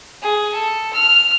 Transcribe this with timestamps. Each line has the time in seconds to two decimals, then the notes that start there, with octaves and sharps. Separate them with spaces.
0.22 G#4
0.54 A4
0.93 F6